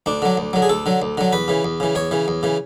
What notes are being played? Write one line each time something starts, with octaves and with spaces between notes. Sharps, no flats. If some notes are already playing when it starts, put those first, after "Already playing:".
D2 D4
D3 F#3
D2
D3 F#3
G#4
D2 A4
D3 F#3
D2
D3 F#3
E2 B4
C#3 E3
E2
C#3 E3
E2 C#5
C#3 E3
E2
C#3 E3